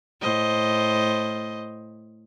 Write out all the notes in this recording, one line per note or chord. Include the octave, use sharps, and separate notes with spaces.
A2 C5 D#5